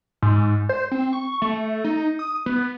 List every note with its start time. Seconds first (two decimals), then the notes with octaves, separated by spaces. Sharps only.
0.22 G#2
0.69 C5
0.92 C4
1.13 C#6
1.42 A3
1.84 D#4
2.19 D#6
2.46 B3